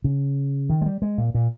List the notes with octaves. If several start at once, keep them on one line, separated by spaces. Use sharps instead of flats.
C#3
D#3
G#3
G3
G#3
A#2
A#2